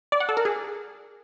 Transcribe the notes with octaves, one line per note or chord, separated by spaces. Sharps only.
D5
F#5
A4
A#4
G#4